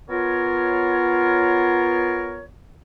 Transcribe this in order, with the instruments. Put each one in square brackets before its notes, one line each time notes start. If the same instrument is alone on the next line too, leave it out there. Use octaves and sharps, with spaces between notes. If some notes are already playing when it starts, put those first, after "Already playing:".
[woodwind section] B3 F4 A#4 C#5